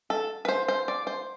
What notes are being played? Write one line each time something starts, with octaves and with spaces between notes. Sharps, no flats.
A4
B4
C5
C5
D5
C5